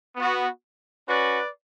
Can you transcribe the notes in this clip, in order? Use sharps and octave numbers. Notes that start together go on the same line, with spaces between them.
B3 F#4
C#4 F#4 B4 D5